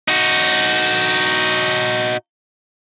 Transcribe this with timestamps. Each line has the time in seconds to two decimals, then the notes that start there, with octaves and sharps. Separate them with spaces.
0.08 D#4 F#4